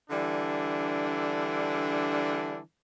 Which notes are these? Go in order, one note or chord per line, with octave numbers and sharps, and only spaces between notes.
D3 E3 G3 D4